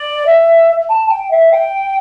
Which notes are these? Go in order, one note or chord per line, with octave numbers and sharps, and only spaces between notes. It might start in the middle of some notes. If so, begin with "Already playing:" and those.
Already playing: D5
E5
A5
G5
E5
G5